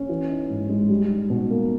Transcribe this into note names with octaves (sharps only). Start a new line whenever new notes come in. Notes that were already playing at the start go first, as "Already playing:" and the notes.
Already playing: C#4
E3
D#4
G#2
G#3
G3
D#4
B2
A#3